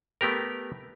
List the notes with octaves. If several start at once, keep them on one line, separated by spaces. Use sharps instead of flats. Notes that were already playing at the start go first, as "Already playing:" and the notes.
A3 B3 G4 A#4